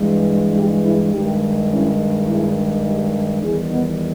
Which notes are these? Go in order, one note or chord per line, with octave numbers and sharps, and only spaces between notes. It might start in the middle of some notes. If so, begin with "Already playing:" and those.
Already playing: G2 E3 G#3
D#4 G4
E4 G#4
G2 D#3 G#3 D#4 G4
C#4 E4
E4 G#4
D#4 G4
E2 D#3 G3 E4 G#4
B3 D#4